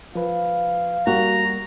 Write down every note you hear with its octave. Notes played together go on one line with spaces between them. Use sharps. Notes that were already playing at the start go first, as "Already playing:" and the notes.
F3 B4 F5
G3 A#3 F#4 A#5